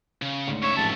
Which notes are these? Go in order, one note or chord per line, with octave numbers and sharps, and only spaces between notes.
C#3
D2 G#2
C#3 C#5 E5
A1 F2 G#2 A5